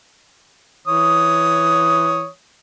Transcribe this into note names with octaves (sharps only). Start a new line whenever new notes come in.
E3 C#5 D#6